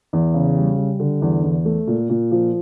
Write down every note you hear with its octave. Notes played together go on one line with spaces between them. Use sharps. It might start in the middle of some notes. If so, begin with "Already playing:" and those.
E2
C#3
G3
G3
D3
E2
E2
A3
A#2
A#2
F3